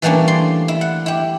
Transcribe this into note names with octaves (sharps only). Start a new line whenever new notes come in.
E3 G3 A3 A#3 C#4 D4
D5 C6
E4
F#5
E4 G4